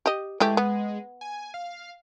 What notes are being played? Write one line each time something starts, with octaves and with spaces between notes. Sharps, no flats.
G4 D#5
E3 G#3 A3 G4
B3
G#5
F5